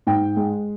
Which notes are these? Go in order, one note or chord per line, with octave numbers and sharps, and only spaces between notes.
G#2 G5
G#3